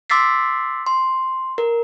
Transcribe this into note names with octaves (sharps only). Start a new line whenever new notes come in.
C6 D6 E6 A6 B6 C7
C6
A#4